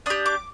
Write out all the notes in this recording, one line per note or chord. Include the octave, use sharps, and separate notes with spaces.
D4 G4 D#6
D6